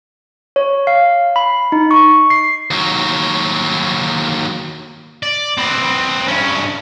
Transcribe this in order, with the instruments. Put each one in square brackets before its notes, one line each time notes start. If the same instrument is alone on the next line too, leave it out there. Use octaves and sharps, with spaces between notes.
[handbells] C#5
F5
B5
D#4
C#6
C7
[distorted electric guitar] D#2 F#3
D5
C4 B4
G2 C#4